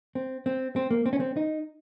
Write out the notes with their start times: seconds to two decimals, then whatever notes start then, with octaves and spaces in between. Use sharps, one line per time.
0.15 C4
0.46 C4
0.76 C4
0.91 A#3
1.06 C4
1.13 C#4
1.20 C4
1.37 D#4